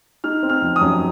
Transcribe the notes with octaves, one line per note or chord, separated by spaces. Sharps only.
D#4 F6
C4
F6
F3
D#6
F#2